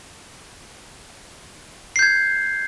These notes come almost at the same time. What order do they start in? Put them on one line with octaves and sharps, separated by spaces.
C7 G6 G#6